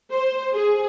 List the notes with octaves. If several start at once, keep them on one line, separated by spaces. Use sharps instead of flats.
C5
G#4